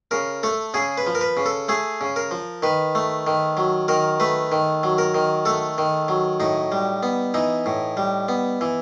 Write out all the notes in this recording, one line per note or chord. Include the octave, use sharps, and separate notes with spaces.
C#3 A#4
A3 A4
C#3 G#4
B4
F3
A#4
B4
C#3
A4
A3 G#4
C#3
A#4
F3
D#3 B4
A3
D#3
F#3
D#3 A#4
A3 B4
D#3
F#3
A#4
D#3
A3 A4
D#3
F#3
A2 D#4
G3
B3
E3 D#4
A2
G3
B3
E3